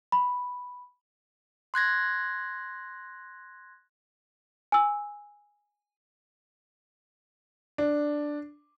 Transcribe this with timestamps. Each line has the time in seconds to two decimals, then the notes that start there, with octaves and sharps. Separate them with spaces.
0.12 B5
1.74 C6 F#6 G#6 A#6
4.72 G#5 E6
7.78 D4